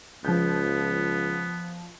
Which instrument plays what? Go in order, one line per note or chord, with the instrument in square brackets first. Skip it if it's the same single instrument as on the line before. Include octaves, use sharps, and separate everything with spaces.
[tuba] C#2 [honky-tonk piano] F3 G6 [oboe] B3